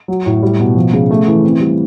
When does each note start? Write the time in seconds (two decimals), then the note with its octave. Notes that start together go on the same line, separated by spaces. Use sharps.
0.08 F#3
0.26 A2
0.43 G3
0.59 B2
0.75 F3
0.93 C#3
1.11 A3
1.27 E3
1.44 C4
1.60 G3